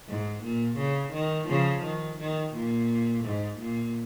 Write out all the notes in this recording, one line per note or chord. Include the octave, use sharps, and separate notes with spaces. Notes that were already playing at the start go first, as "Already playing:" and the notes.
G#2
A#2
C#3
D#3
C#3 F3
D#3
D#3
A#2
G#2
A#2